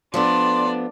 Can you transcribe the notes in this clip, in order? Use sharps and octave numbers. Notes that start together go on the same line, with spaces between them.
F3 A3 B3 D4 D5 C6